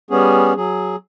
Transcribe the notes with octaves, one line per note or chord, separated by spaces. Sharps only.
G3 B3 C#4 G#4
F#3 G#4